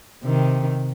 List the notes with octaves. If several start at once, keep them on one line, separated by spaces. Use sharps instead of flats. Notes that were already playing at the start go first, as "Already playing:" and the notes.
C3 D#3